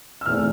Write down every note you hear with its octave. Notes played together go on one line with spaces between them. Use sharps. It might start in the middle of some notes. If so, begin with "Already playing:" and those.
E6
E1 E2 E3 A3 C4 F6